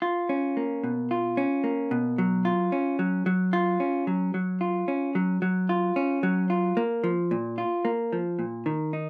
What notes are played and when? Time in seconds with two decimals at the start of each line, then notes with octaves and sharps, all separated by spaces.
0.02 F4
0.29 C#4
0.57 A#3
0.84 B2
1.11 F4
1.37 C#4
1.64 A#3
1.91 B2
2.18 F#3
2.45 F4
2.72 C#4
2.99 F#3
3.26 F#3
3.53 F4
3.80 C#4
4.07 F#3
4.34 F#3
4.61 F4
4.88 C#4
5.15 F#3
5.42 F#3
5.69 F4
5.96 C#4
6.23 F#3
6.50 F4
6.77 A#3
7.04 F3
7.31 A#2
7.58 F4
7.85 A#3
8.12 F3
8.39 A#2
8.66 D#3
8.93 D#4